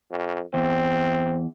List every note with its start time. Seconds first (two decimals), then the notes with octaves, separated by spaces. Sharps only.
0.11 F2
0.54 E2 C4